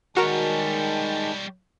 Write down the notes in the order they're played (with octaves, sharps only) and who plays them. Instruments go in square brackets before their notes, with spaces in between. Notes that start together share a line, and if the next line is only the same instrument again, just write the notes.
[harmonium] D#3 G#3 A5 [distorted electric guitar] G3 C#5 [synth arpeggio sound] F#4 A#4